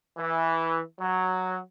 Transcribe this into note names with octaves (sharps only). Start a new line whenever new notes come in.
E3
F#3